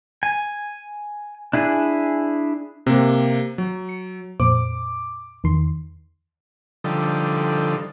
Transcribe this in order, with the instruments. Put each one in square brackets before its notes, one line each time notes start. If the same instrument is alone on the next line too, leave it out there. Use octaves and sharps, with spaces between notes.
[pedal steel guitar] G#5
D4 E4 G#4
[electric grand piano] C3 A#3 [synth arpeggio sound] C4
[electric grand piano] F#3
[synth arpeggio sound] C#7
[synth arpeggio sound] F2 A#2 C5 [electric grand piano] D6
[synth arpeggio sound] E2 D#3 C6
[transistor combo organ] D3 F3 G3 D#4 A4